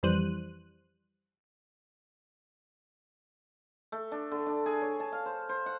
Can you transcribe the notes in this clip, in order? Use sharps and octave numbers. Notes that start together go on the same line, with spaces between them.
F2 E3 G3 C5 F#6 D#7
A3
D4
D3
D4
G#4
C#5
A5
F5
C5
C5
F#5